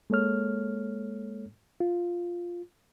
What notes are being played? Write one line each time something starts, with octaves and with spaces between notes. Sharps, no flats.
G#3 A#3 A4 C#5 F6
F4